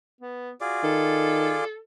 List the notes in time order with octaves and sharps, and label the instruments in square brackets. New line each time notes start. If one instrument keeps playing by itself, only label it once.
[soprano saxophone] B3
[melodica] F4 G#4 D5 [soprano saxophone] F#4
[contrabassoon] D#3 [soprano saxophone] A4